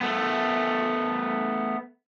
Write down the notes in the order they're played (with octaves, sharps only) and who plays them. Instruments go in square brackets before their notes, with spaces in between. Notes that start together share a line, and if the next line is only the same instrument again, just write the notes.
[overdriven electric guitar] A3 B3